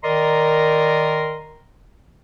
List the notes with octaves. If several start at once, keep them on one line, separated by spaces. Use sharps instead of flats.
D#3 A#4 D5 D#5 A#5 C6